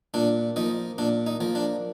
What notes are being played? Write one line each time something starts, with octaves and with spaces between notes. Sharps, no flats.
A#2 D4
F3 A#3 D#4
A#2 D4
D#4
F3 A#3
D4